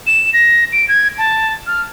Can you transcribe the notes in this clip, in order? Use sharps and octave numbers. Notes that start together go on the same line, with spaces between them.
E7
A#6
D7
G#6
A5
F6